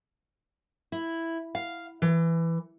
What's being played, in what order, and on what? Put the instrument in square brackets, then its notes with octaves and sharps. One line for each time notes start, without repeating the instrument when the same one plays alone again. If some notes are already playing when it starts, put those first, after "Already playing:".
[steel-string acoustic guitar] E4
F5
E3